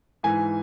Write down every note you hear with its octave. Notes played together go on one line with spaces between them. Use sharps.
G#2 E3 G#5